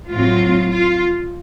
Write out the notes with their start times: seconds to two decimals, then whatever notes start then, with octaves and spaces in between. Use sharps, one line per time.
0.11 A2 F#3 C4 F4
0.70 F4